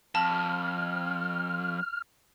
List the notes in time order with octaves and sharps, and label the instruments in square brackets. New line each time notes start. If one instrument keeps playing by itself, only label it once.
[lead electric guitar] F2 [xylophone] A5 [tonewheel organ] F6